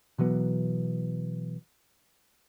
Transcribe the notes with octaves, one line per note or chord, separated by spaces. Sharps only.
B2 E3 F#3 B3